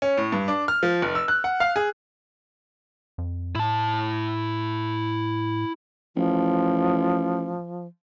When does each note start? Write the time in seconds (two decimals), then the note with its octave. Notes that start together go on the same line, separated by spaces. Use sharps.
0.02 C#4
0.17 A2
0.32 G2
0.48 D4
0.68 F6
0.83 F3
1.02 F1
1.15 E6
1.28 F#6
1.44 F#5
1.60 F5
1.76 G#4
3.18 F2
3.55 A2 E4 A5
6.16 A1 F3